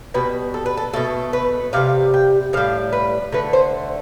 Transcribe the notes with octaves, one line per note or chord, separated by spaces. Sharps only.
B2 G3 B4
A4
B4
A4
B2 A3 A4
B4
C3 G3 F5
G5
A2 G3 F5
B4
D3 A3 B4
C5